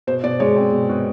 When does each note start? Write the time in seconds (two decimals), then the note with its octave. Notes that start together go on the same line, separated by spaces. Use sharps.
0.07 B2 C5
0.23 B2 D5
0.40 G#3 C#5
0.56 C4
0.72 B2
0.89 B2